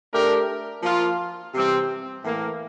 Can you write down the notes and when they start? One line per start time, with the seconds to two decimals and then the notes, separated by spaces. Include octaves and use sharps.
0.12 A3 D4 G4 A#4
0.82 F3 A#3 F4
1.54 C3 E3 G3 C4
2.24 A2 E3 A#3